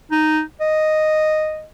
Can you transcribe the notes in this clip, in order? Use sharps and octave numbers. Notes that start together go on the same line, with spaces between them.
D#4
D#5